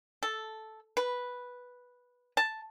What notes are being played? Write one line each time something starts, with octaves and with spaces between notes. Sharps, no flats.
A4
B4
A5